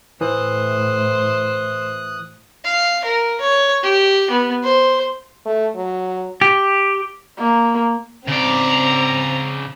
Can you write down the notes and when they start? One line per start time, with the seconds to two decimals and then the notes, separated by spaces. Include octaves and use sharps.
0.21 A2 E3 C5 D#6 F#6
2.64 F5
3.05 A#4
3.41 C#5
3.83 G4
4.31 B3
4.63 C5
5.45 A3
5.76 F#3
6.41 G4
7.38 A#3
8.28 C#3 C4 D5 A#5